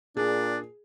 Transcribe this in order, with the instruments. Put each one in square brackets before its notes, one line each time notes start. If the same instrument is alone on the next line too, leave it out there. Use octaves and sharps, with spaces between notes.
[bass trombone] A#2 [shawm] D4 [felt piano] G#4